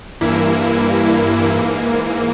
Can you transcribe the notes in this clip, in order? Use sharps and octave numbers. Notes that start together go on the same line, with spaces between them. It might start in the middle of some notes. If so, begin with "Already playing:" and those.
G2 E3 A#3 E4
G#2 E3 A#3